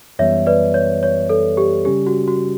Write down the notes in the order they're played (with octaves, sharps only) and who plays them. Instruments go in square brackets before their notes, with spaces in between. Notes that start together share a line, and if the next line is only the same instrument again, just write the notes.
[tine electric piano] F#2 E3 G3 B3 [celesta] C#5 E5
[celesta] B4 D5
C#5
C#5
A4
G4
[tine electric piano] C#3 G3 C#4 [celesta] G4
[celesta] F#4
F#4